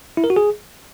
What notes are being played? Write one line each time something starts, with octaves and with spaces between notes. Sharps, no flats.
E4
A#4
F#4
G#4